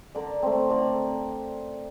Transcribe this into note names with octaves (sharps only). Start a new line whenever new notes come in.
D3 A#4 D5
A3 C4
D3 A#4 D5